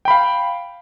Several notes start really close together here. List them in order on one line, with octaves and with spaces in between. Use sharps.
G5 B5 F5